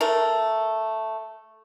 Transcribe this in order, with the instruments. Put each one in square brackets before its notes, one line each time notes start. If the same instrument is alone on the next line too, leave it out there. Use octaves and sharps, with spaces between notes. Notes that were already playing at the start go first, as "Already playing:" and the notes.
[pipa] A3 A#4